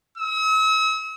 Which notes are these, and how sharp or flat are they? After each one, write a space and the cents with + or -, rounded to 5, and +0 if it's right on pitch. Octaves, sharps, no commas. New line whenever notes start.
E6 -45